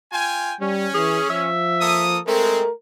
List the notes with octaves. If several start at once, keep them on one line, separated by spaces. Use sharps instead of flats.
F4 G5 G#5
G3 C#4
E3 G#4
F3 E5
A#3 A4 D#6
G#3 A3 C4 A#4